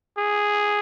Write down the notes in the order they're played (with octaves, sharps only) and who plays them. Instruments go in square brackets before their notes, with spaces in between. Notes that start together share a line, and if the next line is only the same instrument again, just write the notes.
[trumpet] G#4